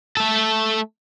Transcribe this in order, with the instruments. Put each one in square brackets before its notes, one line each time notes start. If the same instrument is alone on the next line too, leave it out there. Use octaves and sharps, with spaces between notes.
[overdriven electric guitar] A3 A4